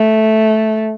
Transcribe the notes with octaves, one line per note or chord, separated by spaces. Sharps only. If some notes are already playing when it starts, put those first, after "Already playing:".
Already playing: A3